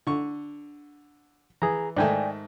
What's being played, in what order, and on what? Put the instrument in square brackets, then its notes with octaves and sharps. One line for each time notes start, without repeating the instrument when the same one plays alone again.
[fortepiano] D3 C#6
[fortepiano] E3 [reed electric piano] G#4 A#5
[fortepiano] G#2 D#3 A3 [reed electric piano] D5 G5 G#5